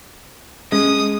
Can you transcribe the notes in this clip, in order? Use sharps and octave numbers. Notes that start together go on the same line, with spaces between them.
G#3 C#4 D#6